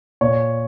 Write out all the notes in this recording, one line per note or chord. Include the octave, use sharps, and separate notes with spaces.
A#2 C#5